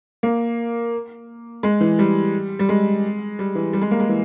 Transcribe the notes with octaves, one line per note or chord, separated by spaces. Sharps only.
A#3
G#3
E3
G3
G3
G#3
G3
E3
G3
G#3
A#3
G#3
E3